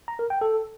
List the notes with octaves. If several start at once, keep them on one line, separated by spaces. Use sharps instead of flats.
A#5
A#4
G5
A4